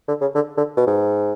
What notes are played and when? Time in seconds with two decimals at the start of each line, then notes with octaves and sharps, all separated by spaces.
0.08 D3
0.21 C#3
0.35 D3
0.58 D3
0.77 B2
0.87 G#2